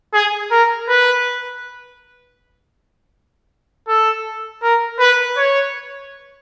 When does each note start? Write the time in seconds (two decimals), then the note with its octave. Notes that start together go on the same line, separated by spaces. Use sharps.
0.14 G#4
0.51 A#4
0.89 B4
3.88 A4
4.63 A#4
4.99 B4
5.37 C#5